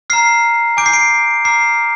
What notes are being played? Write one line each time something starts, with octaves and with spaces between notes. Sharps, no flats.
A#5 F6 C7
G#5 D6 G6 D7
C7
D7
A#5 D6 F6 C7